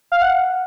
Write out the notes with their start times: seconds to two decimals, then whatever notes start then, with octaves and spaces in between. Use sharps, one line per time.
0.12 F5
0.22 F#5